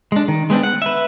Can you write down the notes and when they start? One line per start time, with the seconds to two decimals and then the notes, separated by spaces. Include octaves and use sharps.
0.12 G#3 D4
0.28 D#3
0.50 G#3 B3 C4 D4
0.63 F#5
0.82 B4 E5